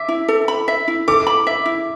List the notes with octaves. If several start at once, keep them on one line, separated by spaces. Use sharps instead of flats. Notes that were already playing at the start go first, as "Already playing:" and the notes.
Already playing: E5 D6
E4
A4
B5
E5
E4
A4 D6
B5
E5
E4